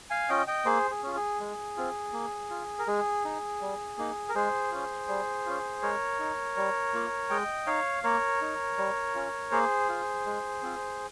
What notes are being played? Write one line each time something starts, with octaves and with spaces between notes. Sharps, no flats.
F5 G#5
C#4 F4 D#5 G5
D#5 G5
A#3 G#4 C5
G#4
C#4 F4
G#4
G#3
C4 F4
A#3
F4
A#4
G#3 G#4
D#4
G3
A#3 D#4
A#4
G#3 G#4 C5
C#4 F4
G3
C#4 F4
G#3 A#4 C#5
D#4
G3
A#3 F4
G#3 D#5 G5
D#4 C#5 F5
A#3 A#4 C#5
D#4
G3
C#4 F4
A#3 G#4 C5
F4
G#3
C4 F4